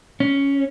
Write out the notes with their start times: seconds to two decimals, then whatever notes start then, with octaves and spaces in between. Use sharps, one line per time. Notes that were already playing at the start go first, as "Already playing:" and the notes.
0.20 C#4